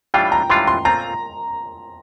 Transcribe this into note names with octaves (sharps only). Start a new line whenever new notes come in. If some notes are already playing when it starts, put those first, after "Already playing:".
A2 E3 G3 D4 F4 G5
A#5
A2 E3 G3 D4 F4 C6
C6
A#2 A3 C4 F4 A#5